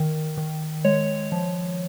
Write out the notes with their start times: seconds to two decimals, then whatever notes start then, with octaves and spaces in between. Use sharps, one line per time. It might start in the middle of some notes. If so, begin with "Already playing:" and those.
Already playing: D#3
0.37 D#3
0.85 G#3 C#5
1.32 F3